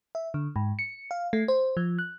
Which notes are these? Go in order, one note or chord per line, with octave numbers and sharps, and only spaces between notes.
E5
D3
G#2
C#7
F5
A3
C5
F3
F#6